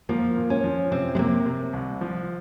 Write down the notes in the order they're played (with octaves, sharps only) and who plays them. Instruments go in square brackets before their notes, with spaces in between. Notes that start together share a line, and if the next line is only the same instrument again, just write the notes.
[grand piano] F3 [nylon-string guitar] A#3
[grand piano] A#2
[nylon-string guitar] C#4
[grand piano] F3
[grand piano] C3 [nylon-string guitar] C4
[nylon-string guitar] G#3
[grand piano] C3 [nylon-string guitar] A#3
[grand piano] C3
C2
F3